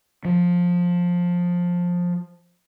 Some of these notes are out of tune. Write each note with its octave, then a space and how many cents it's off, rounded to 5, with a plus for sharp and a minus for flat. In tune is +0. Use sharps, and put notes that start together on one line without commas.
F3 +15